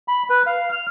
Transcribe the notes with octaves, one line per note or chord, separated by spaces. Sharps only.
B5
B4
F5
F6